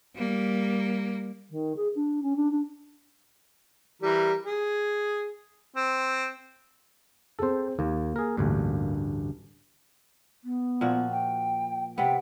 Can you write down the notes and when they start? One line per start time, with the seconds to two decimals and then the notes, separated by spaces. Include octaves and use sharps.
0.15 G3 A#3
1.50 D#3
1.76 G#4
1.95 D4
2.22 C#4
2.36 D4
2.51 D4
4.02 E3 G3 A#4
4.45 G#4
5.76 C4
7.39 C4 G#4 A4 C5
7.79 D#2 A#3
8.16 G#4 A#4
8.37 A1 D2 G2
10.44 B3
10.81 A#2 F3 F#4
11.11 G5
11.98 C3 B3 G5